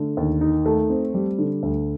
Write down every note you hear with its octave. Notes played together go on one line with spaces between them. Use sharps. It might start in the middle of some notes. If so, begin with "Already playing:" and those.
Already playing: D3 A3
D#2
D#4
A3
C4
G3
D3
D2